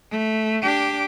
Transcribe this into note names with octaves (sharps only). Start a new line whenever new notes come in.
A3
D4 G4